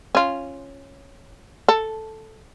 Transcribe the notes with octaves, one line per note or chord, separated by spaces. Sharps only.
C#4 F4
A4